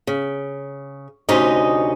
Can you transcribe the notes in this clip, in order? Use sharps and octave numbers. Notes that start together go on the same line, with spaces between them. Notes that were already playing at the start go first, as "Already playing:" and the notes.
C#3
D2 C3 C#4 D#4 D#5